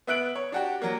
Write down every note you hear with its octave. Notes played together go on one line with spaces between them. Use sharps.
B3 E5 F#6 D7 F#7
C#5
D4 F#4 G4
F#3 A#3